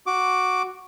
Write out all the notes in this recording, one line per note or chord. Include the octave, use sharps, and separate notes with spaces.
F#4 D6